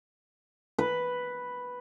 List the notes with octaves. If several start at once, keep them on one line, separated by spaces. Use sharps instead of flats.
B4